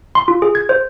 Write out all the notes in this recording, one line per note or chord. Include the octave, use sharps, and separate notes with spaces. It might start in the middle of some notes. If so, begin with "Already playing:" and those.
C6
F4
G#4
G#6
C5